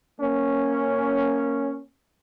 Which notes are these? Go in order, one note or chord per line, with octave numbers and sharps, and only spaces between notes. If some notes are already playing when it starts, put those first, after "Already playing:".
A#3 C#4